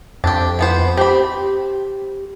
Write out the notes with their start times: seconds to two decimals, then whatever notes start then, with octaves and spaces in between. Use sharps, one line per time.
0.24 F2 D4 G4
0.59 E3 B3 C5
0.97 C4 G4 B5